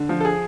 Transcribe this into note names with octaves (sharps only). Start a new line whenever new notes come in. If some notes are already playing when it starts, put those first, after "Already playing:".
Already playing: D3
F3
A4
G#4